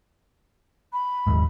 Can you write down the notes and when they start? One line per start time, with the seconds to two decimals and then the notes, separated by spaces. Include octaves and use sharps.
0.93 B5
1.27 D#1 D#2 G#2